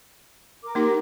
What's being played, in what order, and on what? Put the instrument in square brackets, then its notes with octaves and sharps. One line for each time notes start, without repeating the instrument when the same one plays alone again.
[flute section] A#4 D6
[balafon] A#3 D#4 G4